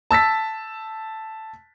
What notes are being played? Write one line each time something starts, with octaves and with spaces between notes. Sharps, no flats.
A5 E6 A6 B6